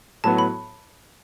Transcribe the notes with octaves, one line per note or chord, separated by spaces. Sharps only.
A2 F#3 B3 F#4 A5
B5